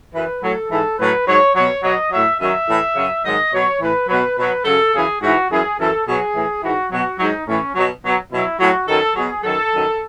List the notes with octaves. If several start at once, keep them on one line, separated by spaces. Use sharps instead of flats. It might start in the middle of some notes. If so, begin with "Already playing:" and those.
F#2 E3 B4
A2 F#3 A4
G#2 E3 A4
A2 F#3 B4
G#2 F#3 C#5
B2 F#3 C#5
B2 F#3 D#5
A2 F#3 E5
F#2 D#3 F#3 E5
A2 E3
F#2 C#3 F#3
G#2 D#3 F#3 D#5
B2 F#3 C#5
A2 E3 B4
B2 F#3 B4
B2 F#3 B4
F#2 C#3 F#3 A4
F#2 C#3 E3 G#4
G#2 E3 F#4
F#2 E3 G#4
F#2 E3 A4
B2 F#3 G#4
A2 E3
G#2 E3 F#4
B2 F#3 F#4
G#2 F#3 D#4
A2 E3 C#4
B2 F#3
B2 F#3
B2 F#3 E4
A2 F#3 F#4
F#2 D#3 F#3 A4
B2 F#3 G#4
F#2 D#3 F#3 A4
F#2 D#3 F#3